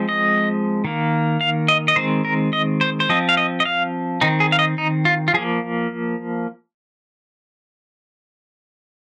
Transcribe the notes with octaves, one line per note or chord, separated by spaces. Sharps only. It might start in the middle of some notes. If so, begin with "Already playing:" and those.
Already playing: F3 G#3 C4
D#5
D#3 A#3
F5
D#5
D#5
D#3 G#3 C4 C5
A#4
D#5
C5
C5
F3 C4 D#5
F5
D#5
D#5
F5
D#3 C4 D#4
G#4
F5
D#5
D#4
F4
F4
F3 A#3 G#4